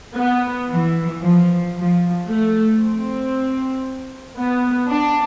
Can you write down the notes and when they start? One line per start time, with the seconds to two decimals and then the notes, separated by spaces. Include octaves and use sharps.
0.16 B3
0.69 E3
1.22 F3
1.75 F3
2.27 A3
2.79 C4
4.38 B3
4.89 D4